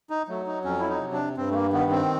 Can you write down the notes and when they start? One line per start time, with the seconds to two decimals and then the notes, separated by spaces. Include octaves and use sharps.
0.10 D#4
0.28 F#3 A3
0.47 D#4
0.64 F2 C#4
0.80 E4
0.89 D#4
1.00 C3
1.12 D4
1.37 G2 C4
1.50 A3
1.54 A#3
1.73 D#3 B3
1.91 C4